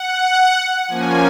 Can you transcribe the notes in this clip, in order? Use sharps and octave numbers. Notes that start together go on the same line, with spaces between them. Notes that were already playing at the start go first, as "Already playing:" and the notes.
Already playing: F#5
F3 A#3 C#4 G#5